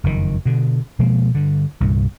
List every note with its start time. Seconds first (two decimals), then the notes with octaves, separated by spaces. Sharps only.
0.04 F#1 F2 G#2 D#3
0.45 B2 D3
0.99 B2 F3 G#3 A#3
1.35 G2 D3
1.80 C2 G2 A#2